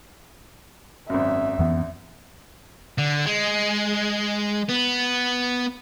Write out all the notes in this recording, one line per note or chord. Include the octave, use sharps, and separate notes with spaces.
G#1 F#2 E5
F2 E3 B3
D3
G#3
B3